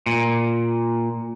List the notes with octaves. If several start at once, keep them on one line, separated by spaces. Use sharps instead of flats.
A#2